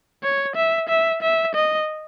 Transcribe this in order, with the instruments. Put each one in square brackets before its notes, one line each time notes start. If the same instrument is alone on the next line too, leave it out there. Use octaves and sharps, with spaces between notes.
[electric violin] C#5
E5
E5
E5
D#5